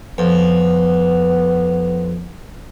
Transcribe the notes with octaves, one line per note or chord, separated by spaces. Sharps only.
F2 B3